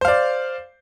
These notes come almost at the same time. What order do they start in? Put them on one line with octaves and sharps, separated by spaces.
C5 F5 D5